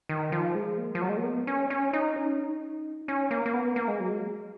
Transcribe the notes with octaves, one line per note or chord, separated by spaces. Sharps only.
D#3
F3
G#3
A#3
F3
F#3
G#3
A#3
B3
C#4
C#4
D#4
C#4
D#4
C#4
A#3
A#3
B3
A#3
G#3
F#3
G#3